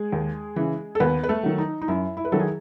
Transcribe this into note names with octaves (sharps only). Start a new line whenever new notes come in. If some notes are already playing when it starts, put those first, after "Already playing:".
Already playing: G#3 G#4
D#2
C#3 E3
A4
D#2 B3 B4
B4
A3 A4
D#3 F#3
D#4
D#4
F#2 E4
E4
B4
D#3 F#3 A4
G#4